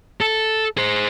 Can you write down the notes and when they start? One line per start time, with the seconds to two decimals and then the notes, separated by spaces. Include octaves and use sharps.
0.21 A4
0.77 G#4 C5